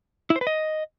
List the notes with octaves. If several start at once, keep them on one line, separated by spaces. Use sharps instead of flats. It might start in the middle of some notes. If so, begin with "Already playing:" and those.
E4
C5
B4
D#5